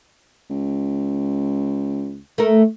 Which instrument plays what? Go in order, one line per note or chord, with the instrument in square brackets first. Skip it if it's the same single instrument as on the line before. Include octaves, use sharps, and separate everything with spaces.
[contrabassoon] C#2
[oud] A3 A#4